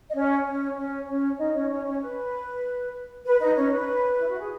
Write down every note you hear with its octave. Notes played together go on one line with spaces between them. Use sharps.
D#5
C#4 C#5
C#4 C#5
C#4 C#5
C#4 C#5
D#4 D#5
C#4 C#5
C#4 C#5
C#4 C#5
B4
B4
D#4 D#5
C#4 C#5
B4
E4
F#4
G#4